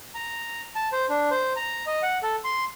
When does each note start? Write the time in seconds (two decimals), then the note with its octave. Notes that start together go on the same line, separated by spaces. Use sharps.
0.15 A#5
0.75 A5
0.92 C5
1.09 D4
1.31 C5
1.56 A#5
1.87 D#5
2.03 F#5
2.23 A4
2.44 C6